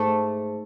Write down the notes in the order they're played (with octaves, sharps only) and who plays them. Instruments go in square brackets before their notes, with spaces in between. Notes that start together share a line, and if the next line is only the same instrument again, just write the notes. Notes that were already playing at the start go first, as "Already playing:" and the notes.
Already playing: [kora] G#2 [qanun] A3